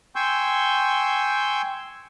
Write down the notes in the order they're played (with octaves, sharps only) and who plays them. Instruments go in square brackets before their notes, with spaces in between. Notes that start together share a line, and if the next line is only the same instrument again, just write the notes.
[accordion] G5 G#5 C6 C#6 E6 G6